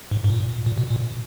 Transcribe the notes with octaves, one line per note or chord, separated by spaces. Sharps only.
G#2
G#2
A#2
A#2
B2
A#2